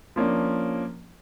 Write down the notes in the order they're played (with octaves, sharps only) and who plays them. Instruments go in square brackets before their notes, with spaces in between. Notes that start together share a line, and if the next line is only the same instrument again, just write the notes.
[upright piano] F3 A#3 C#4 D4